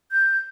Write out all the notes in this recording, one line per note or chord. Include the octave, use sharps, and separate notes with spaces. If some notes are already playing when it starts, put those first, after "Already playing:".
G6